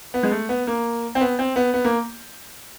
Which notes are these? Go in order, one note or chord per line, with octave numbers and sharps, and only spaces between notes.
B3
G#3
A3
B3
A#3
C4
B3
C4
B3
B3
A#3